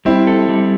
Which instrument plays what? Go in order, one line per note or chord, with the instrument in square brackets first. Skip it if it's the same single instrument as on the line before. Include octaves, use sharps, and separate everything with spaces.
[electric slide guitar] G3 [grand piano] C4 E4
[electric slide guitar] A4
G3